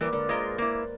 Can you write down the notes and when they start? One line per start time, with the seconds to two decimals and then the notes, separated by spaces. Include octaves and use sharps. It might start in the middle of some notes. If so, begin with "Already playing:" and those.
0.01 E3 G3 A#3 A#4 B4
0.13 D3 G#3 A#4 D5
0.29 G#3 F4 A#4 C5
0.58 A#3 E4